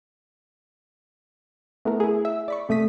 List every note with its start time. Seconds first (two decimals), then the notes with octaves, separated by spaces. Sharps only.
1.85 A3 B3 E4 A#4
2.00 E4 G#4
2.25 E5
2.48 D5 B5 C#6
2.69 C3 A3 D#6 B6 D#7